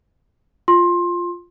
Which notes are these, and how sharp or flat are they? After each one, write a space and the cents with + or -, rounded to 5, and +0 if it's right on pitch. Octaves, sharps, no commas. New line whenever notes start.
F4 +0 C6 +20